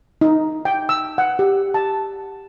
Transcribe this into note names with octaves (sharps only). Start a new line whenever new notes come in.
D#4
G5
E6
F#5
G4
A5